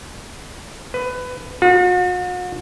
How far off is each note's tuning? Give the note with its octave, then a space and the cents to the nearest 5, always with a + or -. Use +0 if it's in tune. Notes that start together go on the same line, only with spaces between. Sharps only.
B4 +20
F#4 -45